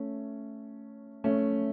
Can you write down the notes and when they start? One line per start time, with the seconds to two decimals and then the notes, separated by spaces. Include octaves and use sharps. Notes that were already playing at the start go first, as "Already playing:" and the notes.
Already playing: A3 C#4
1.24 A3 C#4